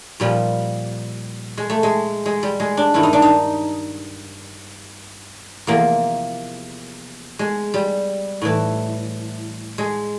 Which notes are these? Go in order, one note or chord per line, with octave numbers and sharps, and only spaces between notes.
A#2 F3 G3
G#3
A3
G#3
G#3
G3
G#3
D4
G2 D#3 E4
D#4
D4
D#4
E2 C3 F3 A#3
G#3
G3
A2 E3
G#3